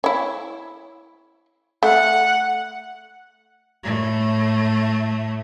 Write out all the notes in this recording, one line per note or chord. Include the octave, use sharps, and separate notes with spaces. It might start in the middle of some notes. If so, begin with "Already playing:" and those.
E4 C#5
A3 F#5
A2 A3